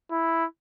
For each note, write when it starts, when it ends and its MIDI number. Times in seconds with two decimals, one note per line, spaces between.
0.11 0.46 64